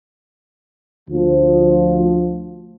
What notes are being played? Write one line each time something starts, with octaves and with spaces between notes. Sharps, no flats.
D2 F3